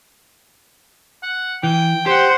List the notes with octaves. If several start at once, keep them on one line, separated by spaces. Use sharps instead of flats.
F#5
E3 G5
G4 C5 F#5